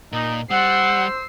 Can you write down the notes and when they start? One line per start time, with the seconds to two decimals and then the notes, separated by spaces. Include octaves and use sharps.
0.13 A#2 D#4
0.51 G3 C5 F#5 E6 C7